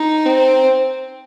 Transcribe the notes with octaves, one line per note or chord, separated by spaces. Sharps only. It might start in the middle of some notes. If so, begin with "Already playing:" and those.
Already playing: D#4
C4